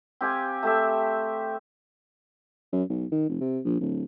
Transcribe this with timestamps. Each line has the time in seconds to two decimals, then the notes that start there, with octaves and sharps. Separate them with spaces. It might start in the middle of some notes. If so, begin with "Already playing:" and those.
0.21 C4 G4 F5 G#5
0.63 A3 G4 E5
2.72 F#2
2.90 B1
3.11 D#3
3.29 F1
3.41 C3
3.65 A#1
3.80 D1